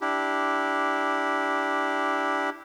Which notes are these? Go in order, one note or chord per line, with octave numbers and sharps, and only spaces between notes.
D4 E4 G4